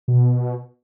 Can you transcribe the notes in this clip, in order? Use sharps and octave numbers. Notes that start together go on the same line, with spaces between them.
B2